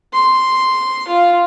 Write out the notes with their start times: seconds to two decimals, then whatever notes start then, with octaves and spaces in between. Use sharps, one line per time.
0.13 C6
1.08 F4